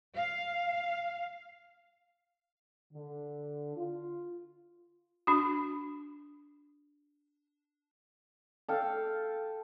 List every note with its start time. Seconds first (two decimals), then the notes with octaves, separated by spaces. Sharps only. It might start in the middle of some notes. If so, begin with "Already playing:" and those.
0.16 F5
2.94 D3
3.77 F4
5.27 D4 F#4
8.68 A4 F5 G5